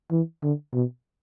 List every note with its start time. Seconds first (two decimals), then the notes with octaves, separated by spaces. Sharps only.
0.11 E3
0.43 D3
0.74 B2